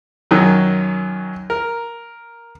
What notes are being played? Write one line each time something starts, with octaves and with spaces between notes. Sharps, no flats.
F#2 D#3 F#3
A#4